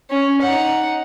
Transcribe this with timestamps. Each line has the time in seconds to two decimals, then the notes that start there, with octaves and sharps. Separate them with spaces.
0.10 C#4
0.42 D#4 F#5